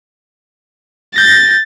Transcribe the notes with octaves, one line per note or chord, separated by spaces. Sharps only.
G6 A6 A#6